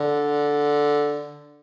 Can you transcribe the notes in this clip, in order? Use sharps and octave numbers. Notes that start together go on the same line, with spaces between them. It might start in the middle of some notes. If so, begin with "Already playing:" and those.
Already playing: D3